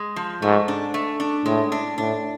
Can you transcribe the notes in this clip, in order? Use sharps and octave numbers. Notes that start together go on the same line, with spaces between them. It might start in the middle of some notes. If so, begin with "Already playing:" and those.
Already playing: G#3
F3
G#2 A3
D4
A3
D4
A2 G#3
D4
A2 D4